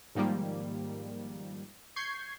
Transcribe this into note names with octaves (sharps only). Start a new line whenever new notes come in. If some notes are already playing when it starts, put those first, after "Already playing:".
G#2 D#3 F3 G3 A#3
C#6 G6 G#6 C7